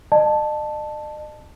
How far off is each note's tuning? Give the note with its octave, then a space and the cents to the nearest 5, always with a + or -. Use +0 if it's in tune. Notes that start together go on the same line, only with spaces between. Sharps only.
D#5 -45 A5 +0